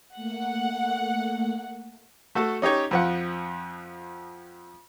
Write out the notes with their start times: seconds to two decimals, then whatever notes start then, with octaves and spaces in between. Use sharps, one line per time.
0.16 A3 A#3 F#5
2.35 A3 F#4 A4
2.62 C#4 D#4 G4 C#5
2.91 F2 F3 F#5